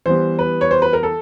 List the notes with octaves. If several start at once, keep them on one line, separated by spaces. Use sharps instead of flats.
E3 G3 B3 C5
B4
C#5
C5
B4
A#4
A4